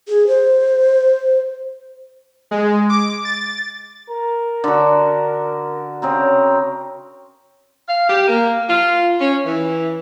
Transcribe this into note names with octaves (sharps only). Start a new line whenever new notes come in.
G#4
C5
G#3
D6
A6
A#4
D3 F#4
C#3 C4 A#4
F5
G4
A#3
F4
C#4
E3